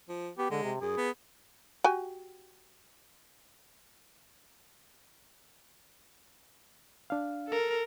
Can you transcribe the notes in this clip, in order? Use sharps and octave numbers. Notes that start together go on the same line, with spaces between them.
F3
B3 G4
D3 G#3
C3
F#2 G#4
B3
F#4 G4 G#5
D4 F5
A4 A#4